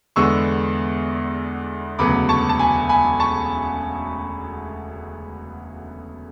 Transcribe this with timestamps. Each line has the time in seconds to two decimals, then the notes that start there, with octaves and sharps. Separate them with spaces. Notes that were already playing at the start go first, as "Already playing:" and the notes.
0.16 E2 D3 G#3 B3 D4 C#6 E6
1.99 E1 D2 C#3 F#3 B3 B5 D6
2.29 A5 C#6
2.49 A5
2.59 G#5 B5
2.89 G#5 B5
3.20 A5 C#6